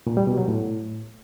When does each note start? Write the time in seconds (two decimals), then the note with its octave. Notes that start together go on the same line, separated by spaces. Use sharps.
0.07 A#2
0.17 G3
0.27 B2
0.38 F#3
0.48 A2